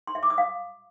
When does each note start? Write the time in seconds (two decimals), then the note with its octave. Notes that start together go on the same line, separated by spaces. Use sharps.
0.07 C6
0.15 E5
0.23 D6
0.30 D#6
0.38 F5